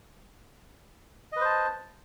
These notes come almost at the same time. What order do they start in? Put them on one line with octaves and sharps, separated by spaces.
D#5 B4 C5 A5